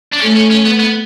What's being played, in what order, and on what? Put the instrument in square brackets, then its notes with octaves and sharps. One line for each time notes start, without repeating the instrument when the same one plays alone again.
[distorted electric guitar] D4
[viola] A3 [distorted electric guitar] C#4
[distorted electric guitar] C#4
C#4
B3
B3